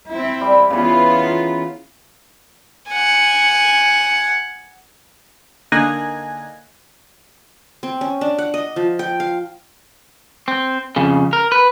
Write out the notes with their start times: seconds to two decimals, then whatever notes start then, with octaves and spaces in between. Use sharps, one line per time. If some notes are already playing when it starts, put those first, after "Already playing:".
0.10 C4 E4
0.41 G3
0.70 C#3 E3 B3 F4
1.22 A#5
2.90 F#5 G#5
5.72 D3 A#3 D#4 G#5 F#6 A#6
7.83 C4
8.01 C#4
8.21 D4
8.38 F#5
8.54 D#5
8.76 F3
8.99 G5
9.20 F5
10.48 C4
10.96 F2 C#3
11.33 A#4
11.52 B4